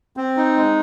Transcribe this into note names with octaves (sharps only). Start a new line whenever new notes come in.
C4
D#4
G#3